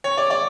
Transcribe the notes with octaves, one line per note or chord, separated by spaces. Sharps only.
C#5
D5
D5